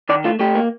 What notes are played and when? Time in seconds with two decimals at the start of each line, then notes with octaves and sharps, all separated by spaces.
0.09 D#3 D5
0.24 A3 F4
0.39 A3 G4
0.55 A#3